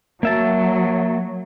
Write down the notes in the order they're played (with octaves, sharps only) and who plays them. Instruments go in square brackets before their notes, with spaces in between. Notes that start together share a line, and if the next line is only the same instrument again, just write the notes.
[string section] F#3 [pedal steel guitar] A#3 E5 A5